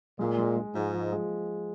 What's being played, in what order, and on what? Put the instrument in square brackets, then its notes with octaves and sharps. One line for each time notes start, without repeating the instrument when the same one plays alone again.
[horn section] A#2 [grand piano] G#3
[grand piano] G#3
G#3
[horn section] G#2 [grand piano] F3
[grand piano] F3
G#3